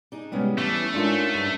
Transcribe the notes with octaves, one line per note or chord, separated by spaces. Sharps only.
D4 D#4 G#4
A2 C3 G3 G#3 B3 C#4
E3 A3 D4 E4
G#2 C#4 D4 F4 A#4
G2 A6 D#7